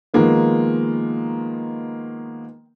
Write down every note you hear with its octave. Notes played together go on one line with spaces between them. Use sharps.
D#3 F3 G#3 A#3 B3